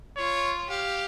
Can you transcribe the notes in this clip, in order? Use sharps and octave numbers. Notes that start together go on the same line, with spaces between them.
F4 C#5
G4 F5